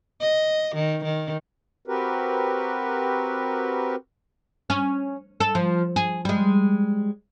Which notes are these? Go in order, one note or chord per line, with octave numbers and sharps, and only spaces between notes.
D#5
D#3
D#3
C4 F#4 G4 A#4 B4
C#4
A4
F3
G#4
G3 G#3